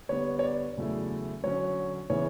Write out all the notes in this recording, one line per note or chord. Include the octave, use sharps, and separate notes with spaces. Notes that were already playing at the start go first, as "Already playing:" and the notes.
D3 G3 B3 D4 C#5
C#5
D5
E2 C#3 F#3 A3 E4
D3 F#3 C#4 C#5
C#3 E3 B3 E4 C#5